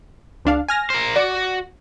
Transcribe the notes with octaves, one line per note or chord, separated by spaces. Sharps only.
C#2 D4 F5
G#5 F6 A#6
A#4 C5
F#4 D5